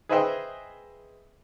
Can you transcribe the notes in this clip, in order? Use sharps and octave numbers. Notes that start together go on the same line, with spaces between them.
G#4 B4 C5 D#5 E5 G5